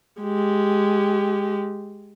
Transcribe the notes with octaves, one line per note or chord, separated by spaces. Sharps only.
G#3 G4